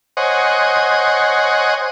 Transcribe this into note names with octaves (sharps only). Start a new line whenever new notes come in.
C5 C#5 D#5 F#5 G#5